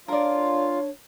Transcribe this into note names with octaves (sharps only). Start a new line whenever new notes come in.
D4 F4 A#4 C#5 D5 F5